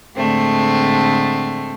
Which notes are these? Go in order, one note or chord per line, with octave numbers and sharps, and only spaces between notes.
A2 D3 G#3 A3 C4